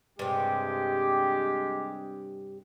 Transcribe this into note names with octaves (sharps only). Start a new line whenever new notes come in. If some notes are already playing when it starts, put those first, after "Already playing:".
G2 C3 G#3 G4